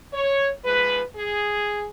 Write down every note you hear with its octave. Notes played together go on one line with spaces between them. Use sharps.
C#5
G#2 F3 G#3 B4
G#4